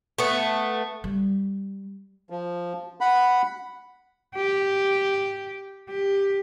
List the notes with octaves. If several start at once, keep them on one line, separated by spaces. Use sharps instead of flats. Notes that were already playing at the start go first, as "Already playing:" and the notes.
A3 B3
G3
F3
F#5 B5
G4
G4